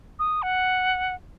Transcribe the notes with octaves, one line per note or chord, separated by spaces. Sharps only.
D#6
F#5